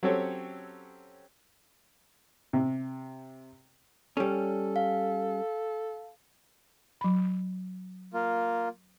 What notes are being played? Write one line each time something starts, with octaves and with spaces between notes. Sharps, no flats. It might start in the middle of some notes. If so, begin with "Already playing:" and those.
F#3 C4 C#4 G4 A4 C#5
C3
G3 C#4 A4
F5
F#3 B5
A#3 F4